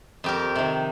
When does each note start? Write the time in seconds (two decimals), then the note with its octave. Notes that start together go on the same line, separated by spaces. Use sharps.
0.24 F2 G4 A#4
0.55 C3 D#3